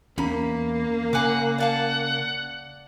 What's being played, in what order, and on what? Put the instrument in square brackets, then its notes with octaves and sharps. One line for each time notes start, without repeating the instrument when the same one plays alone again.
[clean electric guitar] E2 C#4 A#5 [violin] A#3 [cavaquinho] B5
[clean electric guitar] C#3 [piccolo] F#5 [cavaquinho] G#5 B5 D6
[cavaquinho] D5 F5 A5 [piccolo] F#5